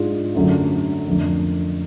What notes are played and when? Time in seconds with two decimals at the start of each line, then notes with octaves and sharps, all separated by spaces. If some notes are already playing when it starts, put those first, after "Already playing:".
Already playing: G#2 G#3 D4 F4 G#4
0.35 F#2 D3 F#3 A3
1.07 F2 D3 F3 A3